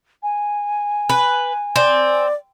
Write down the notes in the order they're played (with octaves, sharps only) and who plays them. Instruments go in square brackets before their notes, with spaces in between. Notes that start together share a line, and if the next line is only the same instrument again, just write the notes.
[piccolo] G#5
[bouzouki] B4
[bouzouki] C4 [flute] D5